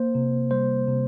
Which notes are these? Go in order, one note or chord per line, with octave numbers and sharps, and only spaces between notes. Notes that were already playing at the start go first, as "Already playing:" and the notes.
Already playing: A#3 C5
C3
G3 C5
C3